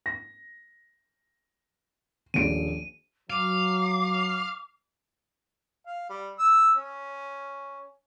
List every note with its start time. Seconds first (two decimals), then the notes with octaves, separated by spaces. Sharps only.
0.06 A#6
2.34 D#1 A#1 D7 D#7
3.30 F#3 F5 D6
5.87 F5
6.10 G3
6.39 E6
6.76 C#4